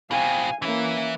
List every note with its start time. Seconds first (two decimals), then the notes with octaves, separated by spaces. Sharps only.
0.11 B2 C4 F5 G#5
0.62 E3 A#3 C#4 E4